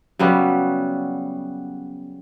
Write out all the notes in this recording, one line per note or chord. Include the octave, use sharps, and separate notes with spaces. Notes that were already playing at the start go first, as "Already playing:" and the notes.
C#3 F#3 G3 B3